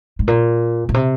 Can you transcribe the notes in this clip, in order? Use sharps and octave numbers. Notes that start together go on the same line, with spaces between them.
G#2
A#2
A#2
C3